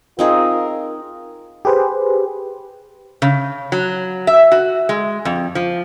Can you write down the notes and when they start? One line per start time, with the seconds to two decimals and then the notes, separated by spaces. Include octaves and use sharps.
0.19 C4 D#4 F4 G#4 A#4
1.65 G4 G#4 B4 C5
3.22 C#3
3.72 F#3
4.27 E5
4.52 F#4
4.89 G#3
5.25 F2
5.55 F3